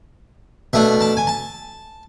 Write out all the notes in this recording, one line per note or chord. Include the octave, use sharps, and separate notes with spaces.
B2 A3 D4 E5
A5
G#5
A5